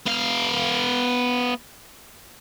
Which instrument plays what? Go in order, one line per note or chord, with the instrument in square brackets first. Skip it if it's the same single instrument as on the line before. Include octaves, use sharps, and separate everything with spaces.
[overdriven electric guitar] B3 F5